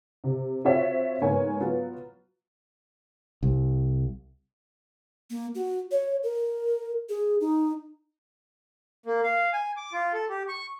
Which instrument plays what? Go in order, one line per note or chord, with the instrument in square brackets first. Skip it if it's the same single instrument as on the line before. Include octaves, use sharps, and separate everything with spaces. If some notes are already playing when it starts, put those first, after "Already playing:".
[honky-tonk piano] C3
C4 F4 F#4 C#5 E5
G#2 A#3 B3 C#5 G#5
F#3 B3 F4
[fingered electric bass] C2
[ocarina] A#3
F#4
C#5
A#4
G#4
D#4
[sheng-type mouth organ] A#3
F5
G#5
D6
F4
A4
G4
C#6